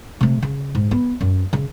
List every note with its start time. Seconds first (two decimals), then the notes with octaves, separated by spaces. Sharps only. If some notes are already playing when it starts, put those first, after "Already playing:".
0.21 C3 A3
0.42 C#3
0.75 G#2
0.91 B3
1.21 F#2
1.53 C#3